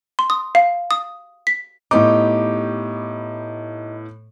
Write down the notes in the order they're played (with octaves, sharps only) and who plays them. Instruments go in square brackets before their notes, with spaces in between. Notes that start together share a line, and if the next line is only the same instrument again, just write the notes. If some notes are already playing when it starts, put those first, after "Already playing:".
[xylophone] C6
D#6
F5
D#6
B6
[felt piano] A2 B3 D6 [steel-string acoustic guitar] D#4 G4